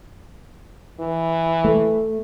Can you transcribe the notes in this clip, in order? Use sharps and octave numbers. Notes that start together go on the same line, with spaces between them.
E3
A3